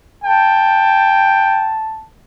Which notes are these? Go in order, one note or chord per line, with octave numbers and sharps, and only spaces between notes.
G5 A5